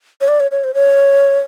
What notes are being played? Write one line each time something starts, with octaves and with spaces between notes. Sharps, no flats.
C#5
D5
C#5
C#5
C5
C#5